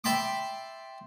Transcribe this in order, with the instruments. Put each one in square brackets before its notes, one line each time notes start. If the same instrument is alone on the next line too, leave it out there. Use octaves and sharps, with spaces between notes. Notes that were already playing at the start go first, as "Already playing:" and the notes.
[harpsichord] E5 G5 A5 B5 C6 D6